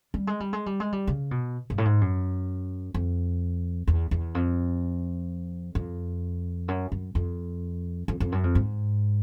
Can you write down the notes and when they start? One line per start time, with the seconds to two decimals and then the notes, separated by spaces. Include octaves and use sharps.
0.14 G3
0.27 G#3
0.40 G3
0.53 G#3
0.66 G3
0.80 G#3
0.92 G3
1.07 C#3
1.31 B2
1.70 G2
1.78 A2
1.85 G#2
2.01 F#2
2.94 F2
3.88 E2
4.11 E2
4.35 F2
5.75 F2
6.68 F#2
6.92 F#2
7.15 F2
8.08 F2
8.20 F2
8.32 F#2
8.44 F2
8.55 G#2